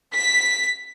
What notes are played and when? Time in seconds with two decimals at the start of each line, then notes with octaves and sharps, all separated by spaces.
0.15 B6